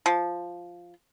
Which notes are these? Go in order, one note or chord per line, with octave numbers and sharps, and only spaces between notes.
F3